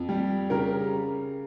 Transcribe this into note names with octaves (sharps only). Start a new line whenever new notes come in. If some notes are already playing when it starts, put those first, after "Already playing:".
Already playing: F2
G3
C#3 G4 A#4